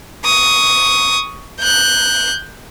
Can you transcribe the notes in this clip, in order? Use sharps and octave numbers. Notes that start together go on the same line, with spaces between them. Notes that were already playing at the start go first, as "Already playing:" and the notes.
C#6 D#6
F#6 G6